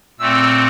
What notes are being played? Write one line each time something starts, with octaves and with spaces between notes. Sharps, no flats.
A#2 A3 C4 E6